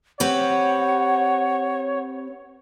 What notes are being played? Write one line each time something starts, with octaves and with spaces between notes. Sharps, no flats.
C4 G4 B4 C#5 F#5